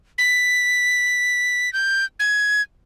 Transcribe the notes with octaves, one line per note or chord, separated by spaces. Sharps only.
B6
G6
G#6